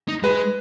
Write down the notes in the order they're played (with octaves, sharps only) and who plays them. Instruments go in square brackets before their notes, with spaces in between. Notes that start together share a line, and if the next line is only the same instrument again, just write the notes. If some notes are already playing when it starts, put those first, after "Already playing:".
[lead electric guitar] D#4
[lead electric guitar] G#3 [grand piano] B4